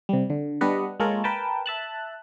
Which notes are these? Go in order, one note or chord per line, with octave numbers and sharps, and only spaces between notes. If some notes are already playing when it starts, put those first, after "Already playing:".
C3 G3
D3
G3 B3 D4 B4 D#5 F#5
G#3 A#3 F4 A4 A#4 C#5
A#4 B4 G5 A5
E5 A5 F#6